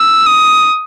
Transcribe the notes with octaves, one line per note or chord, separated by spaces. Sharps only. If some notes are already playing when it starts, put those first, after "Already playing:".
Already playing: E6
D#6